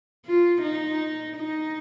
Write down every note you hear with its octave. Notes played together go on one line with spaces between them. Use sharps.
F4
D#4
D#4